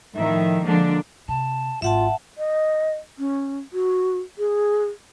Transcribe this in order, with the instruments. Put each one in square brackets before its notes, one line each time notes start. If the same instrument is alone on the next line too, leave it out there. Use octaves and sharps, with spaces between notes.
[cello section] A2 D#3 F3 E5
D3 F3 G#3 A#3 D4
[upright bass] C3 [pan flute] A5
[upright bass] G#1 [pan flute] F4 [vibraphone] E5 F#5 A5
[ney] D#5
C#4
F#4
G#4